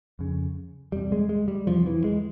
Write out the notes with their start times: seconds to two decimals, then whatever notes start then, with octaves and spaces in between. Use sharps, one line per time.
0.19 F2 C#3
0.92 E2 C3 G3
1.12 G#3
1.29 G#3
1.48 G3
1.67 E2 C3 F3
1.86 E3
2.04 G#3